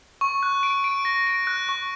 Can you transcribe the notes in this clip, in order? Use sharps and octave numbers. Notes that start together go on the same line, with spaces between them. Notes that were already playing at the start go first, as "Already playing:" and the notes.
C#6
F#6
D7
D7
A#6
D7
F#6
C#6